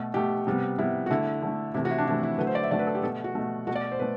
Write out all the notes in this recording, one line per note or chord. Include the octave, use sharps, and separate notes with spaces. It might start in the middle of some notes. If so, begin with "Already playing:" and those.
Already playing: B2 A3
B2 A3 G4
C3 G3 B3
C3 G3 B3 E4
F#4
D3 A3 E4
D3 A3
C3 E3 A3 E4
F#4
E4
D4
C3 E3 A3 E4
E4
D3 F#3 A3 B4
C5
D5
E5
D3 F#3 A3 D5
B4
A4
G4
B2 A3 A4
F#4
B2 A3
B2 A3 F#4
D5
C5
B2 A3 B4